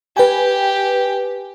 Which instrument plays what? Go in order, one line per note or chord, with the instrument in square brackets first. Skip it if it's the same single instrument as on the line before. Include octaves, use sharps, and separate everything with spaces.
[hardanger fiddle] G4 [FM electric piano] B4 G5 G#5